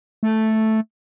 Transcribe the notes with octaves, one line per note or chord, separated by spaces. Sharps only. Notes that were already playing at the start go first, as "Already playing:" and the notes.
A3